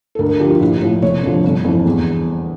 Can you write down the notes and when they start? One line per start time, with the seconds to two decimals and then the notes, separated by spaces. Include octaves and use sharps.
0.15 A4
0.19 D2 A#4
0.29 A#4
0.40 D3 F3 G4
0.50 F4
0.60 A#1 E4
0.82 A2 F3
1.02 F1 C#5
1.23 F2 D3 F3
1.44 G1
1.65 F2 E3
1.86 E2